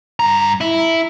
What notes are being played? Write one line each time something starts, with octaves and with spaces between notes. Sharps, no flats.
G2 A#5
E4